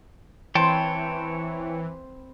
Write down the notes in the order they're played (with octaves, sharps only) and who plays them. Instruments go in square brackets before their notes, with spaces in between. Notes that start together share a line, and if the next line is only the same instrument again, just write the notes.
[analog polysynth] E3 [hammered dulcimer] C4 C5 B5 [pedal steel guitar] C#5 G5 A5